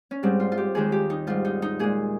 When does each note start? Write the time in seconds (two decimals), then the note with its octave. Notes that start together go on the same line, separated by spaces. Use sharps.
0.11 C#4
0.23 G#2 G3 C4
0.40 F4
0.52 F4
0.58 G4
0.75 D#2 D#3 G#3 G#4
0.92 G4
1.10 D#4
1.27 G#2 G3 F4
1.45 D#4
1.62 D#4
1.79 A#2 G#3 G#4